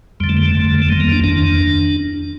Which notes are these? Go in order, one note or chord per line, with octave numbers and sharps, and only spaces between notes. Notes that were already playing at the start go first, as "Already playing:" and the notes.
F2 D3 G3
A3
G3
A3
F2 D3
A3
F2 D#3 G3
A#3
D4
F2 D#3 D4